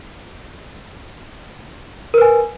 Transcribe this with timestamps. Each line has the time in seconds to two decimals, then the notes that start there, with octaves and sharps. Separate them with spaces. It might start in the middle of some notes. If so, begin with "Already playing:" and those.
2.14 A#4
2.18 B4
2.22 G#5